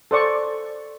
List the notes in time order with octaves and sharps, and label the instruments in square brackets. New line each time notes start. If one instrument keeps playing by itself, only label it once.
[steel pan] A4 C5 D5 C#6